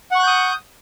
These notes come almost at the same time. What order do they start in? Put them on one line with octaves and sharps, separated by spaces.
F#5 C#6 F#6 G6 D#6